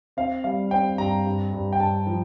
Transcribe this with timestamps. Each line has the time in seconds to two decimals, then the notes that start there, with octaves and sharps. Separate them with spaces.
0.17 C4 F5
0.44 G3 F5
0.71 C4 G5
0.98 G2 A#5
1.26 G2
1.53 G2
1.73 G5
1.79 G2 A5
2.07 F3